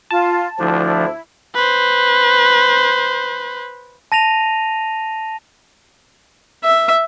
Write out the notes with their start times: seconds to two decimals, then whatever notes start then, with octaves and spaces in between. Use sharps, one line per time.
0.11 F4 A5
0.59 D2 F3 D4 E4
1.55 B4 C5
4.12 A5 A#6 D#7 F7
6.64 E5